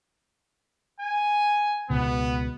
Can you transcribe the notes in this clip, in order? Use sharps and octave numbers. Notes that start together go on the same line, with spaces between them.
G#5
C#2 B2 B3